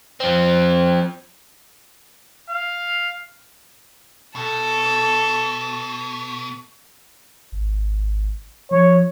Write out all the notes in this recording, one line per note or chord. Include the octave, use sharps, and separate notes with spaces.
F3 C4
F5
B2 A4
G#1
F3 C#5